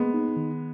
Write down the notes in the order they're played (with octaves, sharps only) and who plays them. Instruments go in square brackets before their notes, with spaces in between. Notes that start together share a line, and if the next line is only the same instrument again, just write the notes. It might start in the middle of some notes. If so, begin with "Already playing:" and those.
Already playing: [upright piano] G#3 B3 [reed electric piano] A#3
[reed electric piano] D#4
D#3